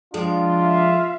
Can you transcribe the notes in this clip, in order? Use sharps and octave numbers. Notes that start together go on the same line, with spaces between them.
F3 G#3 D4 F4 G5
E5 F5